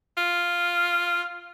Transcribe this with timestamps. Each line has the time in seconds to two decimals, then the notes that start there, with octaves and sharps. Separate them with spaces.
0.17 F4